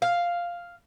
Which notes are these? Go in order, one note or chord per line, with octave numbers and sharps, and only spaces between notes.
F5